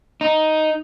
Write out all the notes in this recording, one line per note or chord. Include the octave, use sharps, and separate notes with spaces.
D#4